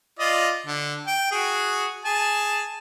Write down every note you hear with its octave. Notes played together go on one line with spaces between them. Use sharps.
F4 D5 D#5
D3
G5
F#4 G#4
G#4 G#5 A5